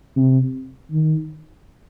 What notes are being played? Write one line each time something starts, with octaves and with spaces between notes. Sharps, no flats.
C3
D#3